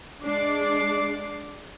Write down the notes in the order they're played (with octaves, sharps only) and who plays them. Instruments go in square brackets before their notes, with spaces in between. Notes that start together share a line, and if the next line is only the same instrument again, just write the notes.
[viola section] G#3 D4 [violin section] D5 D6 C7